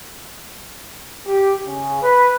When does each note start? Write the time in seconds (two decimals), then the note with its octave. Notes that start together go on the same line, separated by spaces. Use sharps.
1.27 G4
1.66 C#3
2.03 B4